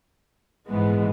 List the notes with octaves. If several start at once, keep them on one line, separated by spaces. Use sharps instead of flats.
A#1 G#2 E3 G#3 B3